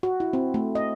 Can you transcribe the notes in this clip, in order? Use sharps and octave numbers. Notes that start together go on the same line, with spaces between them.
F#4
E4
C4
A3
D#5